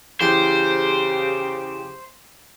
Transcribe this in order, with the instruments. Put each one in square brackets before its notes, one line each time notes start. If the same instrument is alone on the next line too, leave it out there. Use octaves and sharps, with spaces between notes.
[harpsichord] E2 G5 C6 [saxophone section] C#3 G4 [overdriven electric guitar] C5